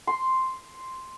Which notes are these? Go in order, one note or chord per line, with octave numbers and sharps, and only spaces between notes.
C6